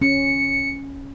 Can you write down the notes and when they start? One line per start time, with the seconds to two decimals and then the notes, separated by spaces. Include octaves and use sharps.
0.02 C#4 C#7